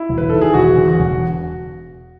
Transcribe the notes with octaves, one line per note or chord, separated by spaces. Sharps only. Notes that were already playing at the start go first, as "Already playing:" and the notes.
Already playing: E4
E1
B4
D#3 A4
G#4
E1 F#4
E2
F#4
E1